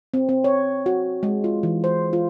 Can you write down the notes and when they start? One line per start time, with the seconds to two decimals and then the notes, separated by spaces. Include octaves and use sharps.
0.14 C4
0.29 C4
0.44 C#5
0.86 F#4
1.23 G#3
1.44 F4
1.63 E3
1.84 C5
2.13 F4